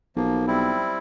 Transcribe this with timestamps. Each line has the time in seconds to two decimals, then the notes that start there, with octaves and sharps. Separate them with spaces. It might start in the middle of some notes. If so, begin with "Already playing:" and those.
0.16 B1 F3 A#3
0.47 G3 C4 E4